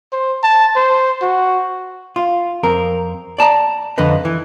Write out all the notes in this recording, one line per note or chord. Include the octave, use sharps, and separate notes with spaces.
C5
A5
C5
F#4
F4
F2 C4 A#4
D5 A5 A#5
F2 D3 B4 D#5
E3